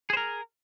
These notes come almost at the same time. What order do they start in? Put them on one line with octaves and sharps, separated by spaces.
G#4 C5 A#4